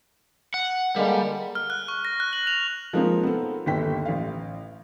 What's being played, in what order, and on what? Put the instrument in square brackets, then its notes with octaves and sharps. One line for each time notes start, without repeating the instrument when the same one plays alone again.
[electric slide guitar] F#5
[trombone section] D3 G#3 A#3 [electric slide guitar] G3
[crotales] F6
F#6
C#6
A#6
F#6
F#7
F7
[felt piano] F3 G#3 A#3 C4 D#4 F4
B3 C4 A4
G1 D#2 A4 G5 B6
A1 F5